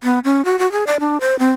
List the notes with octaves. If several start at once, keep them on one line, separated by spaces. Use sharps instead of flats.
B3
C#4
F#4
F#4
G#4
D5
D4
C5
C4